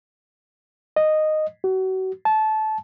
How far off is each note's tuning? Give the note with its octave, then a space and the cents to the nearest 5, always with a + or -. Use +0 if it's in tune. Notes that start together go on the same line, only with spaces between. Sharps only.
D#5 -5
F#4 +35
A5 -20